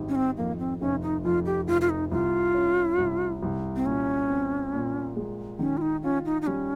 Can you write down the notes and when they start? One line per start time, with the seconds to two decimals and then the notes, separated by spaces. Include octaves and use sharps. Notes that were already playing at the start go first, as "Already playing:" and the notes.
Already playing: G#1 G3
0.09 C#4
0.15 C4
0.37 F2 A#3
0.59 C4
0.81 F1 C#4
1.02 D#4
1.24 F2 F4
1.46 G4
1.68 F1 F4
1.81 F4
1.90 D#4
2.11 C2 F4
2.54 C#4
2.98 C2
3.43 C2
3.76 C4
3.85 A#2 C#4
4.29 C4
4.73 A#2
5.16 G#3
5.59 D#3 C#4
5.77 F4
5.82 D#4
6.03 C#4 F4
6.26 D#4
6.42 D#4
6.47 G3 C#4